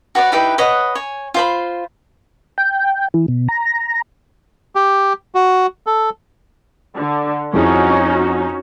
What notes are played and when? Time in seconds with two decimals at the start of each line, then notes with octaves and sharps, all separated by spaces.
0.15 F#4 B4 C#5 D5
0.32 D#4 E4 G4 B4
0.58 B4 C#5 D#5 F#5
0.95 C#5 G#5
1.34 F4 C5 B5
2.58 G5
3.14 E3
3.28 B2
3.49 A#5
4.75 G4
5.35 F#4
5.86 A4
6.96 D3
7.54 F2 C#4 D#4 E4 F#4 G#4